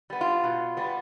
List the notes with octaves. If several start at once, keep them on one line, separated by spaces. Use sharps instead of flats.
G3 B3
F4
B2
G3 B3